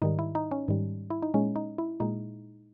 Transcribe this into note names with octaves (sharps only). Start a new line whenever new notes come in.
G#2 D#3 G3 D#4
E4
D#4
C#4
G#2 D#3 G3
E4
D#4
A#2 G#3 C#4
D#4
E4
A#2 G#3 D#4